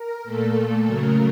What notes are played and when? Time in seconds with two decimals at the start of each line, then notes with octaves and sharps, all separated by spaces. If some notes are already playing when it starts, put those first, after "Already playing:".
Already playing: A#4
0.24 A#2 A3 A4
0.85 C#3 F#3 A3 A#4